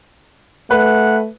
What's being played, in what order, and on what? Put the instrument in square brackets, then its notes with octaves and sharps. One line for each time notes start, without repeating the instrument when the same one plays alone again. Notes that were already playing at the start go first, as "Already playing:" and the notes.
[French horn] A3 [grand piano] B4 [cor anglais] F#5